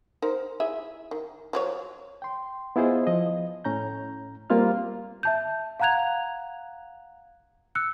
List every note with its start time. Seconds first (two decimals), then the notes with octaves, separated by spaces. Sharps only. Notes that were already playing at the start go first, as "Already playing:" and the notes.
0.22 D#4 A#4 C5
0.60 E4 G#4 E5
1.11 D#3
1.53 F3 F#3 C#5
2.22 G5 C6
2.76 B3 E4 F4 G#4 C5 D#5
3.07 F3 D#5
3.65 A2 C#4 A#5 G6
4.50 G3 A#3 C4 F4 F5 F6
5.23 E5 A5 G6
5.80 F5 F#5 A#5 F#6 G#6 F7
7.75 E6 F#6 C#7